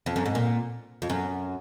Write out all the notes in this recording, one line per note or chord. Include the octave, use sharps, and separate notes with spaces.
F2
F#2
G#2
A#2
F2
F#2